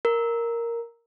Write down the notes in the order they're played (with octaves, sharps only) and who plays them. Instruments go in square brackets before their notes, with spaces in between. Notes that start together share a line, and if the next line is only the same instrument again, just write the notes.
[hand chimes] A#4